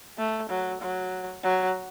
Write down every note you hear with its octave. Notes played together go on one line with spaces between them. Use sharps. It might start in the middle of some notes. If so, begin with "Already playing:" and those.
A3
F#3
F#3
F#3